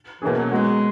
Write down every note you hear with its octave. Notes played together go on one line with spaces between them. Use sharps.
B2 E3 A#3 C#4 G#4
F#3
F#3 G#3 B3 F#4